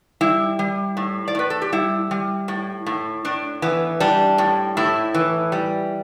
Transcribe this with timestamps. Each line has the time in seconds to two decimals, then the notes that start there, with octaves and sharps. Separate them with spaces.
0.21 G3 E4
0.59 G3
0.97 A2
1.28 D5
1.35 A2 B4
1.50 A4
1.62 G4
1.72 G3 E4
2.11 G3
2.48 A2
2.86 A2
3.25 A2 D4
3.62 E3 B3
4.00 G3 D4
4.38 A2
4.77 A2 E4
5.14 E3
5.52 G3